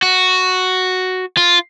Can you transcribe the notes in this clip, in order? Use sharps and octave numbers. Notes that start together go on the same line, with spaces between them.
F#4
F4